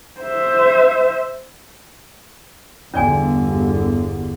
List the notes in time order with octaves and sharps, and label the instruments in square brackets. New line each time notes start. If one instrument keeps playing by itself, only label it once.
[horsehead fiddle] C5 E5
[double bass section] G1 E2 D3 [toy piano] C#4 D5 G#5